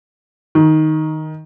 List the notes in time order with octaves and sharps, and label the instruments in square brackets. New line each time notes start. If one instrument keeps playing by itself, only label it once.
[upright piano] D#3